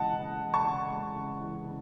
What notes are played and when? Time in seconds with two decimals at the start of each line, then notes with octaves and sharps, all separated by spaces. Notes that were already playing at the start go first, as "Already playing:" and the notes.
Already playing: C#3 E3 G#3 D#5 F#5 A5
0.17 C#3
0.41 E3
0.54 A5 C#6
0.66 C#3
0.91 G#3
1.16 C#3
1.41 E3
1.66 C#3